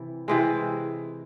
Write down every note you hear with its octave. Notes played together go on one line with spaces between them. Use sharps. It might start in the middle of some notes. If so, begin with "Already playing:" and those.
Already playing: C3 E3
C3 E3 G#3